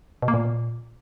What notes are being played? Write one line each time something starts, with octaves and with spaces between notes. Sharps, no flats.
B2
A#3
A#2